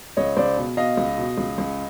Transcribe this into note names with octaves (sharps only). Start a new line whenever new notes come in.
C#2 C#5 D#5
C#2 C5 D5
B2
B2 D#5 F5
C#2
B2
C#2
C#2